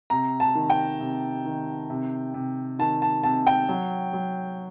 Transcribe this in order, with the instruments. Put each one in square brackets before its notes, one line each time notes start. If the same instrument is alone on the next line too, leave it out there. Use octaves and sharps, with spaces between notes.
[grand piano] C3 A#5
A5
D#3
G5
C3
D#3
C3
C3
D#3 A5
A5
C3 A5
G5
F#3
F#3